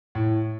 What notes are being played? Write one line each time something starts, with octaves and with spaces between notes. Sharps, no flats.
A2